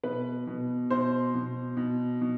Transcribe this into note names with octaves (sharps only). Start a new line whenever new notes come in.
B2 B4
B2
B2 C5
B2
B2
B2